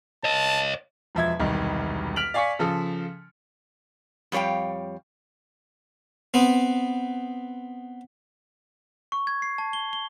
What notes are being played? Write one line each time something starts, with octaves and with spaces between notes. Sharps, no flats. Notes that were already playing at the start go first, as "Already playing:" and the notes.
C#5 D#5 A5
E1 F3 E5 G#6
E1 C2 D#3
F6 B6 D7 F7 F#7
D5 F5 G#5 C#6 B6 C#7
C#3 F3 A4
F2 G3 C#5 F5 G5
B3 C4
C#6
G#6
C7
A5
G7
G7